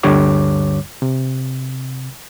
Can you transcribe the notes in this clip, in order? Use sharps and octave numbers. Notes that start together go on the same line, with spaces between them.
D2 G2 D3 G3 C#5 D6
C3